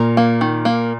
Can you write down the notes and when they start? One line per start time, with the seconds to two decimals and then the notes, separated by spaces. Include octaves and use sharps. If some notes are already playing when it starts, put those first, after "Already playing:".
Already playing: A#2 A#4
0.17 A#3
0.41 D#3
0.65 A#3